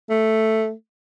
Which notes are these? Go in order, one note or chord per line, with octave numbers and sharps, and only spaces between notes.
A3